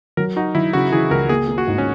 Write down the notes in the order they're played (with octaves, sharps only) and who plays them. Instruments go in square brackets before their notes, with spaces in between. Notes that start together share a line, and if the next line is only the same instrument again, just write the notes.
[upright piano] F#3 [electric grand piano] A#4
[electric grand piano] D#4 [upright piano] F#4
[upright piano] F#3 [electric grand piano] E4
[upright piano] C#3 [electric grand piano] F#4
[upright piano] E3 [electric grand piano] G#4
[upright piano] C#2 [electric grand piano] A#4
[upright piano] A#3 [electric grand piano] G#4
[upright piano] A#3
[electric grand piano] F#4
[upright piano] G#2
[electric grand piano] C#4